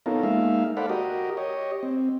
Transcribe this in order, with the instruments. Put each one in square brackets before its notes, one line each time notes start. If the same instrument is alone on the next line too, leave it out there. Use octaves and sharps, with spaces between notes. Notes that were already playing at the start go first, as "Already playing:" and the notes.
[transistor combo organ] B3 C#4 D#4 F4 A4 A#4
G#3 A#3 D#4 E5 F5
A4 C5 D5 F5 F#5 B5
F#4 G4 A#4 D#5
G4 C#5 D#5
C4